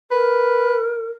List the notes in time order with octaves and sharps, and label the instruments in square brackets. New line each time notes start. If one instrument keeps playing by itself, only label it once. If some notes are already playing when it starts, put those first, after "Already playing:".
[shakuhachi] A#4 [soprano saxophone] B4